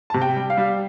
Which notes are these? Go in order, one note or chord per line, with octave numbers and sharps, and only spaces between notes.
C3 A5
G5
G3
F5
G3